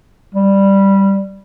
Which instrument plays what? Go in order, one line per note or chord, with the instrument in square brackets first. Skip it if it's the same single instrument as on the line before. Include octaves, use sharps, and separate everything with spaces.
[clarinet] G3